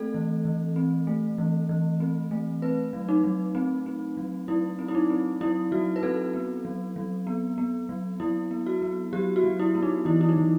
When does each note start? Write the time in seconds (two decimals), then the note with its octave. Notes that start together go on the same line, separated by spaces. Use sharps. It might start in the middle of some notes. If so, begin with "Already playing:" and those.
Already playing: A3 C4 A4
0.14 E3
0.45 E3
0.76 C4
1.07 A3
1.38 E3
1.69 E3
2.00 C4
2.31 A3
2.62 C4 B4
2.93 F#3
3.09 D#4
3.24 F#3
3.55 C4
3.86 C4
4.17 F#3
4.48 F#3 E4
4.79 C4
4.88 E4
4.95 D#4
5.10 C4
5.41 F#3 E4
5.72 F#3 F#4
5.96 B4
6.03 C4 A4
6.34 B3
6.65 F#3
6.96 F#3
7.27 B3
7.58 B3
7.89 F#3
8.20 F#3 E4
8.51 B3
8.66 F#4
8.82 B3
9.13 F#3 G4
9.36 F#4
9.44 F#3
9.60 E4
9.75 B3
9.83 D#4
10.05 E3 E4
10.21 E4
10.29 D#4
10.36 E3